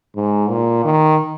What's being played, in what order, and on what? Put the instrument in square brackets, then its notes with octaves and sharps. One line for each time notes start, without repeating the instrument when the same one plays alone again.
[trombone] G#2
A#2
D#3